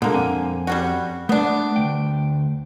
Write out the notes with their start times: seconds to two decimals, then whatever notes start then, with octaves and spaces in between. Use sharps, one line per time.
0.02 A#2 D3 G#3 A#3
0.14 F2 C4 G#5
0.67 G3 C#4 F#4
1.29 A3 B3 D4
1.76 D2 A3 G5